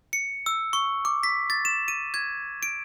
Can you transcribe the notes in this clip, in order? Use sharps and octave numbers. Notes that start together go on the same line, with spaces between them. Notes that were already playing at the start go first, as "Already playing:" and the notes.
C#7
E6
C#6
D6
B6
A6
E7
D#7
G#6
D7